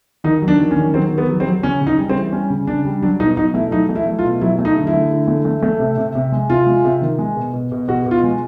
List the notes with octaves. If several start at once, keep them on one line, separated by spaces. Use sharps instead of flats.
D#3 D#4
F#3
D4
D#3
C#4
D#3
F#3 C4
D#3
B3
F#3
C4
F#3
C#3 C#4
C#3
D#4
G3
C4
E3
G3 C#4
C#3
C#3 D4
G3
F#3 D4
B2 D#4
B2 D#4
A3 E4
F#3 D#4
A3
E4
A3
F4
B2
F#3 E4
A3
D#4
D3
E4
A3
D3
A3
A3
A3
C3
C3
C3
G#3
C3 F4
G#3
C3
D#3
G#3
B2
B2
B2
B2 F#4
B2 F4
G#3